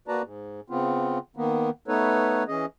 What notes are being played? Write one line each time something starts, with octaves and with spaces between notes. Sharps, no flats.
A#3 F#4 B4 D5 A5 A#5
G#2
C#3 B3 C4 F4
D#3 A#3 B3
A3 B3 D#4 A4 B4 C#5
E3 C#4 G#4 D#5